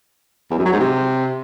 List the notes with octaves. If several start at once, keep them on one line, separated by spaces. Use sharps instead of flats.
E2
F#2
F#3
G#2
C3